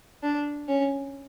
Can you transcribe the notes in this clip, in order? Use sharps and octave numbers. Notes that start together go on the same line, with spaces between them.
D4
C#4